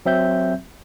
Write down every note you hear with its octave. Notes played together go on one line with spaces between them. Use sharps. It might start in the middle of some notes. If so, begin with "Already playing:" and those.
F#3 C4 E5 G6